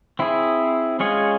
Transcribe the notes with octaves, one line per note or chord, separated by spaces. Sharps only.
C4 E4 G#4
G#3 C#4 F4 G#4 C#5